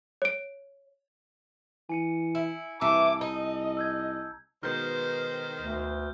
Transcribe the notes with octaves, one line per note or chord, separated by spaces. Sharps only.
C#5 D7
E3 G#5 C#7 D#7
E4
C2 E3 A3 A5 A#5 D6 E6
D#4 D#5
E6 G6 G#6
B2 D#3 G#3 C5 F6 G6
D2